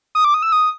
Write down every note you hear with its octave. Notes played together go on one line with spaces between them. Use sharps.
D#6
D6
D#6
E6
D#6